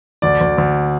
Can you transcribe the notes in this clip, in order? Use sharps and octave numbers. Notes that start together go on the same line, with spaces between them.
D2 D5
D2
D2